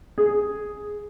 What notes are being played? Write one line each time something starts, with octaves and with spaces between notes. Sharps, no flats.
G#4